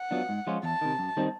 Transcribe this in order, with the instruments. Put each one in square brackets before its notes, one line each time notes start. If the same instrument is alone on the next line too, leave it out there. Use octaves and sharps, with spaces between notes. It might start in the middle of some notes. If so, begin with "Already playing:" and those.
Already playing: [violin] F#5
[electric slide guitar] F#3 B3 D4 F4
G#2
F3 G#3 C#4 F4
[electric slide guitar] E2 [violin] A5
[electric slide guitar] C3 D#3
F#2
D#3 G3 C4 D#4